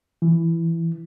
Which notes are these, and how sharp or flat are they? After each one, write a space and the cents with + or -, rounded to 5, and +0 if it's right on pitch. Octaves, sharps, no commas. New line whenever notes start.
E3 +10